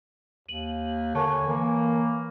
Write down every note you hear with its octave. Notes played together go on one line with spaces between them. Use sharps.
D#2 D#7 F#7
D3 A#4 C#5 G#5 A5 C#6
E3 A#3